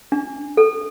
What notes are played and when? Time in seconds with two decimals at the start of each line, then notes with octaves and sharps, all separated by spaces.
0.12 D4
0.57 A4